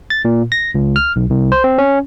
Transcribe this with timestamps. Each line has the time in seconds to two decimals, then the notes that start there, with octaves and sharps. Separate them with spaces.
0.10 A6
0.25 A#2
0.52 A#6
0.75 C#2
0.96 F6
1.16 B1
1.30 C2
1.52 C5
1.64 C4
1.78 C#4